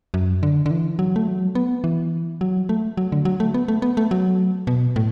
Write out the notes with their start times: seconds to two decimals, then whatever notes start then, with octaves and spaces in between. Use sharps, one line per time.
0.14 F#2
0.43 D3
0.66 D3
0.71 E3
0.99 F#3
1.16 A3
1.28 F#3
1.55 B3
1.84 E3
2.41 F#3
2.69 A3
2.97 F#3
3.12 D3
3.25 F#3
3.40 A3
3.54 B3
3.68 A3
3.82 B3
3.97 A3
4.11 F#3
4.67 B2
4.96 A2